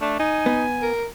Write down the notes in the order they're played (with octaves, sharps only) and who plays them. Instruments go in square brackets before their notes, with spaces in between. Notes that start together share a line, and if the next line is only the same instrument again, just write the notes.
[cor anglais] A3 [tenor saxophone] D4
[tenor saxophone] D#4 [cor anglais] G#5
[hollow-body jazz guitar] B3
[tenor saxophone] A#4